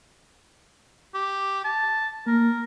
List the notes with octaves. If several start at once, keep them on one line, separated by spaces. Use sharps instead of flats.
G4
A5
A#3 A#4